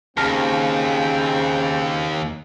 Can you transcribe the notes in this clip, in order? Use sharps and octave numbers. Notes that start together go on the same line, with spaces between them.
D#2 C#3 C4 G5 A5 F6 A#6